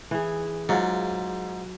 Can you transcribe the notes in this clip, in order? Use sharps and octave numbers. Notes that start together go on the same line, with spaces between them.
E3 G#4
G#2 F#3 F4